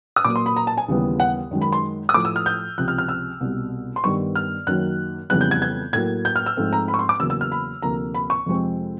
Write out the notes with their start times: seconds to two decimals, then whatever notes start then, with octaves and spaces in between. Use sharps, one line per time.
0.16 D#6
0.25 A#2 F#3 A#3 D6
0.36 C6
0.46 B5
0.56 A#5
0.67 A5
0.77 G#5
0.88 D#2 C#3 E3 G3 B3
1.20 F#5
1.51 F#2 D#3 G#3
1.62 B5
1.73 C6
2.09 D#6
2.14 A2 F3 A3 D6
2.25 E6
2.36 F6
2.46 G6
2.78 C#2 C3 F3 F#6
2.88 F6
2.98 F6
3.09 E6
3.41 C2 B2 G3
3.96 C6
4.04 G2 D#3 G3 B3 C#6
4.36 F6
4.67 F#2 D#3 F#3 A#3 F#6
5.30 F2 C#3 E3 G3 B3 F#6
5.41 G6
5.51 G#6
5.62 G#6
5.93 A2 F#3 A#3 G#6
6.25 G6
6.36 F6
6.46 E6
6.57 G#2 F3 A3 C4
6.73 A#5
6.88 B5
6.94 C#6
6.99 C6
7.09 D6
7.20 E2 C#3 F#3 A#3 E6
7.30 E6
7.41 F6
7.52 B5
7.82 D2 C3 F3 A#3 A#5
8.15 B5
8.30 C#6
8.46 F2 C3 F3 G#3 C4